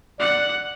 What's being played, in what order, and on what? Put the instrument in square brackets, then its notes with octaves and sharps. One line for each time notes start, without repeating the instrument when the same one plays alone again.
[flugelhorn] D5 [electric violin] F#5